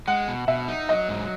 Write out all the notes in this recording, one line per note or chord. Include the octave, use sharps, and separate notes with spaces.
G#3 F#5
B2
B2 E5
D#4
F#3 D#5
G#2